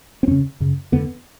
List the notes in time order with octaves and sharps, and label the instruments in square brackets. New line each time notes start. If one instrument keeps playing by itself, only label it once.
[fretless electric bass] C4
F2 C#3 C#4
F#2 C#3
F2 D3 B3